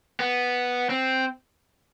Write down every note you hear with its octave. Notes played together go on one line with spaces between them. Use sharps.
B3
C4